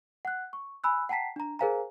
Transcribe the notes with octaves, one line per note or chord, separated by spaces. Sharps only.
F#5 F#6
C#6
G#5 B5 E6 F#6
F#5 G5 A5 A#5 B6 C7
D4 A#5
G#4 A#4 C5 F5 G#5 A#5